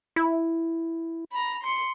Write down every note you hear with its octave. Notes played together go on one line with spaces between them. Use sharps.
E4
A#5 B5
C6 C#7